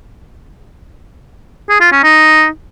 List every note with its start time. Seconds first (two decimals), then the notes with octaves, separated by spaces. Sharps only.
1.69 G#4
1.80 F4
1.92 C#4
2.03 D#4